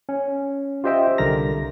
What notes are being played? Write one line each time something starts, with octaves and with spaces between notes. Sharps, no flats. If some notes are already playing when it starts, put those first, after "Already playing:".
C#4
F4 G4 C5 D#5 E5 G5
C2 D3 G3 A#4 A#5 A#6